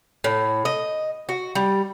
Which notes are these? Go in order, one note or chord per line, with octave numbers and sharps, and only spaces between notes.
A2
D#5
F#4
G3